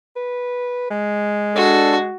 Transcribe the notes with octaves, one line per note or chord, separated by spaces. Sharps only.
B4
G#3
D4 F#4 A4